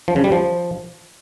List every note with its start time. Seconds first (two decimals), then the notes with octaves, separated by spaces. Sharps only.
0.08 F3
0.16 C#3
0.24 G3
0.32 F3